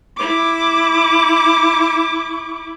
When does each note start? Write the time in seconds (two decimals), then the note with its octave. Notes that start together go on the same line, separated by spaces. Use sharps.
0.17 E4 D6